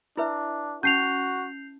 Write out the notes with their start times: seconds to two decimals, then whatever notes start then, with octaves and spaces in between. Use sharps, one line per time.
0.17 D4 E4 B4 E5
0.83 C#4 F#4 A5 G6 C7 F7